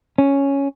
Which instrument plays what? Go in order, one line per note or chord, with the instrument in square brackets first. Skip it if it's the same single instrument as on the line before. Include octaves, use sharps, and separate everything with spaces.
[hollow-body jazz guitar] C#4